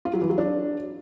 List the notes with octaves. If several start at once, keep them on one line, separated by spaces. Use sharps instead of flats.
F4
F#3
E3
F#3
D4